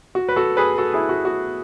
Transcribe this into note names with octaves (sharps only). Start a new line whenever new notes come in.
F#4
B4
F#4 A4
G#4 B4
F#4 A4
E4 G#4
F#4
F#4